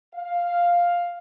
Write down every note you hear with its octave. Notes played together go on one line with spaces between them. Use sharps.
F5